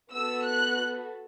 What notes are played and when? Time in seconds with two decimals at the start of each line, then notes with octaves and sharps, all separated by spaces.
0.12 B3 F#4 A4 E6
0.45 F#6